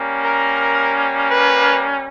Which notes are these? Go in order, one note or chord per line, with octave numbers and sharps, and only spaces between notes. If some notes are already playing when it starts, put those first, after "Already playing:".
Already playing: G3 A#3 C#4
A#4
B4